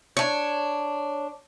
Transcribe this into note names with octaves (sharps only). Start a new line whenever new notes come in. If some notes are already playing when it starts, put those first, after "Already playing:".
D4 C#5